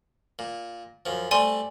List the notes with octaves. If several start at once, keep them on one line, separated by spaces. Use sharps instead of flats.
A#2
F#2 F3
G3 A3 C4 D5 G#5 C6